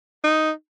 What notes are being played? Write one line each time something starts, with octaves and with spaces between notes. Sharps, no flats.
D#4